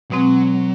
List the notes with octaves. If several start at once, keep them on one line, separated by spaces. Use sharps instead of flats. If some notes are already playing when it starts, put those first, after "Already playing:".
B2 F#3 G#3 C4